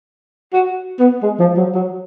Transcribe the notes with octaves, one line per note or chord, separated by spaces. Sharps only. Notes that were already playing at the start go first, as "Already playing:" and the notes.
F#4
B3
G#3
F3
F#3
F#3